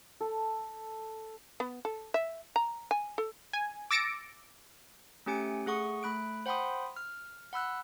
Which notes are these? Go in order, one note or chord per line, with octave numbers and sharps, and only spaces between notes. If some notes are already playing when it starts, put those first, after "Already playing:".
A4
B3
A4
E5
A#5
G#5
A4
G#5
D6 E6 A6 A#6 C#7 D7
A3 C#4 G4 G#5 C#7 D7
A3 G#4 F#5 C#6 D#6
A3 B5 F#6 D7
C5 F#5 G5 B5 C6 D#6
F6
F#5 B5 E6 F#6